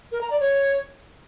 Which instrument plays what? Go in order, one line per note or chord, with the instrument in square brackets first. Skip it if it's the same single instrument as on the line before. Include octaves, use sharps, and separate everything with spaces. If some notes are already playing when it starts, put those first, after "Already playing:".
[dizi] A#4
A#5
D5
C#5